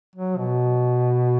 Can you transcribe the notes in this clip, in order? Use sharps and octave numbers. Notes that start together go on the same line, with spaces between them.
F#3
B2